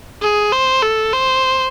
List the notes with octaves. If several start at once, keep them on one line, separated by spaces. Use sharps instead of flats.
G#4
C5
A4
C5